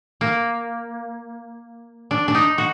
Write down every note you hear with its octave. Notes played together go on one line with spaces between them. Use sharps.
A#3
D4
D4
D#4
F#4